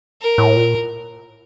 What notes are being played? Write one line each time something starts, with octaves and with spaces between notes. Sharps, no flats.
A#4
A2
A#2